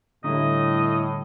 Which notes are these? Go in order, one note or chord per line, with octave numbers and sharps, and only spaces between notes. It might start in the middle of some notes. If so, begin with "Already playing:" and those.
A2 D3 G3 D#5